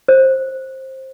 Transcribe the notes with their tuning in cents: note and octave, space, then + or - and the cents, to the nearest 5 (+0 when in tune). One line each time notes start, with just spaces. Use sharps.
C5 +15